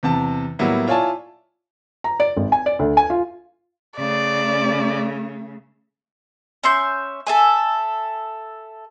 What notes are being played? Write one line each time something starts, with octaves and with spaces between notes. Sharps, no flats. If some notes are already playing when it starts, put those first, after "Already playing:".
E2 C3 A5
A2 F#3 G3 A#3 B3 E4
E4 F4 C#5 D5 G#5 A5
A#5
D5
G#1
G#5
D5
D2
G#5
F4
C#3 A3 D5
C#4 E5 C6 G6
A4 E5 G#5